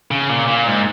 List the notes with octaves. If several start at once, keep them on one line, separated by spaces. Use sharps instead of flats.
C#3
A#2
A#2
G#2